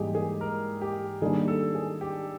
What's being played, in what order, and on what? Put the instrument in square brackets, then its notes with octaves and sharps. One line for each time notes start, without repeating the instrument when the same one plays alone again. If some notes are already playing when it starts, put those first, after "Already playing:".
Already playing: [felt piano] G#2 E3 G3 A#3 [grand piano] G4 G#4
[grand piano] G#4
A#4
G4
[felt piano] D#3 G3 A#3 D4 [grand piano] G#4
[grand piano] A4
G#4
G4